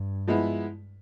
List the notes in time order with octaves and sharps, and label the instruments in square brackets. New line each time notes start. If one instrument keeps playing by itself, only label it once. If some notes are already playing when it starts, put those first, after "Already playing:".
Already playing: [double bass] G2
[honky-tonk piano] F3 G#3 B3 E4